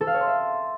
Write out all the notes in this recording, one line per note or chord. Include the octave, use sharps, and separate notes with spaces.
A4
F5
C#5
C6
E5